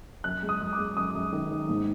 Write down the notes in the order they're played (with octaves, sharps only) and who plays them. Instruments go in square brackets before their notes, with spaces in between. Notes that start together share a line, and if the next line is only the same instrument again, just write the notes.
[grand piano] F#2 F#6
G#3
D#6
F#2
D6
G#3
F#2 D#6
F#2
D#3
D#3
G#2